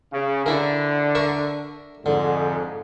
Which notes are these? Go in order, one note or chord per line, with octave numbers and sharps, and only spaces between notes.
C#3
D3 E4 A#4
A#4 E5 C#6
F2 G#2 D3